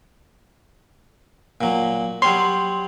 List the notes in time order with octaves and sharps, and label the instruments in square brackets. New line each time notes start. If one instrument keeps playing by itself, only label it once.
[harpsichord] A#2 F#3
[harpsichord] F#3 G3 C#5 [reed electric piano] C6